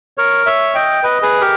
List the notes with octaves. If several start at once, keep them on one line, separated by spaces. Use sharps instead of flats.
A#4 C#5
C#5 E5
D#5 G5
B4 D#5
G#4 B4
G4 A#4